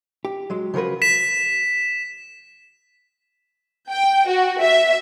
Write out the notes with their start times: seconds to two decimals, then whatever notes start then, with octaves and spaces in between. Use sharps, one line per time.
0.25 G4
0.50 F#3 G#3
0.74 C#3 F3 F#3 A#4 B4
1.02 B6 E7
3.90 G5
4.28 F#4
4.61 E5